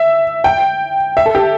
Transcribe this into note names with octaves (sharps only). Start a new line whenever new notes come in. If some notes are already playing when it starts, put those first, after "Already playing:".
Already playing: E5
G5
E5
A4
G4